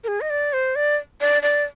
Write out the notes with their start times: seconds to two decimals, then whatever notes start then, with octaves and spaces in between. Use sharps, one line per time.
0.04 A#4
0.08 G#4
0.21 D#5
0.30 D5
0.53 C5
0.76 D5
1.21 D5
1.43 D5